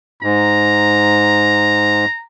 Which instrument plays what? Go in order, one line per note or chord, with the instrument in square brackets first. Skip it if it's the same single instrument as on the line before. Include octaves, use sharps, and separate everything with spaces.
[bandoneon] G#2 [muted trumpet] A#5